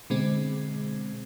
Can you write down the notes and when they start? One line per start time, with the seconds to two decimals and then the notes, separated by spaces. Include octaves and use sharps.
0.10 B2 D3 G#3 C4